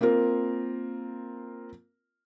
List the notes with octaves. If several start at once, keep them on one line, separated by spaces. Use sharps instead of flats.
A#3 C4 F4 A#4